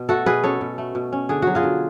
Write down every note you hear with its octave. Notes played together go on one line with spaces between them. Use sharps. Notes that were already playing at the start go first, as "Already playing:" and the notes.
Already playing: B2
A3 F#4 A4
B2 G#4 B4
C#4 A4 C#5
B2
A3
B2
C#4
D3 G#4
F#3 F#4
F4 G#4
D3